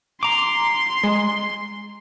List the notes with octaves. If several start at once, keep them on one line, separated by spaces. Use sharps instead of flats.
A#5 C6 D6
G#3